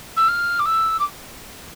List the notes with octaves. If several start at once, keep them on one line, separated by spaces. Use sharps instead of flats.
E6
F6
D6
E6
D6